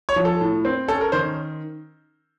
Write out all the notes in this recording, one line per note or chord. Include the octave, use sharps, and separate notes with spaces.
C#5
F3
A4
A2
C4
C#4 A4
A#4
D#3 C5